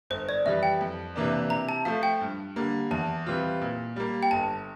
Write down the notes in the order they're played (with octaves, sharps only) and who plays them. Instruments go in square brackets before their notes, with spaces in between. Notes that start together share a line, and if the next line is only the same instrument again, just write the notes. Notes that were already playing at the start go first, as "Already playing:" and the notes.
[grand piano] G1 [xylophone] C5
[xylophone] D5
[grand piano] F2 E3 G3 [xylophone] E5
[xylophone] G5
[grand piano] F2
C3 E3 A#3 D4
[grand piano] C3 [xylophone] A#5
[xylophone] A5
[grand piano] F3 A3 [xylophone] F5
[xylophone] G5
[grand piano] G2
D3 G3 A#3
[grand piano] E2 [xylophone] A5
[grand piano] E3 G3 C4 F4
A#2
G3 A#3
[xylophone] G5
[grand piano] G1 [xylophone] A5